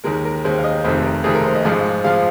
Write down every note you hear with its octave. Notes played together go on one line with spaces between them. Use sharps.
D#2 D#3 G#3 A#4
A#4
D#2 D#3 G#3 C5
F5
D#5
F1 F2 C3 D#3 C5
A#4
F1 F2 C3 D#3 G#4
A#4
C5
D#5
G#1 G#2 F3 G#3
F3 G#3 F5